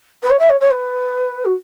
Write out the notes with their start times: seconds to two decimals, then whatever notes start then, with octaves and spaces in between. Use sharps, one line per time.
0.23 B4
0.30 C#5
0.39 E5
0.50 C#5
0.61 C#5
0.71 B4
1.45 F#4